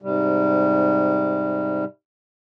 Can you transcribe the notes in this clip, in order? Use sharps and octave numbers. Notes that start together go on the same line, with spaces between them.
G#2 C3 G3